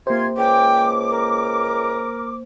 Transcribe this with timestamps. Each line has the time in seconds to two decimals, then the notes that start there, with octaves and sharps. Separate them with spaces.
0.07 C3 A#3 F4 C5 C6 G#6
0.37 C#2 G5 D6
1.10 A#4